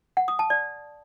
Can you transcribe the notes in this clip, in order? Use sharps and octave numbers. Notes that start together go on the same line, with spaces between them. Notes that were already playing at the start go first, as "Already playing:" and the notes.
F#5
D#6
A5
D5